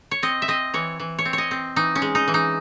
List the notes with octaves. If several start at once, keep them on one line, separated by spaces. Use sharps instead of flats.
C#5
C4 D#5
E5
C4 D#5
E3 C#5
E3
C#5
C4
C#5
D#5
C4
E3 D#4
C#4
G#3
D#4
E3
D#4